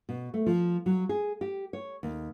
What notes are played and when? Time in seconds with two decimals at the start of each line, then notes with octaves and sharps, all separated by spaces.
0.09 B2
0.34 A3
0.46 F3
0.86 F#3
1.09 G#4
1.41 G4
1.73 C#5
2.03 D#2